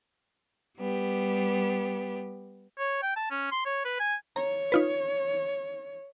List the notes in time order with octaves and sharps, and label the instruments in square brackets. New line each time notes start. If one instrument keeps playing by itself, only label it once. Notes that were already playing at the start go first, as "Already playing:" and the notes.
[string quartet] G3 B3 G4
[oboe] C#5
G5
A5
C#4
C6
C#5
B4
G#5
[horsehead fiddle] C#5 [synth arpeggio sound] A#5
[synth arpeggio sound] D#4 F4 B4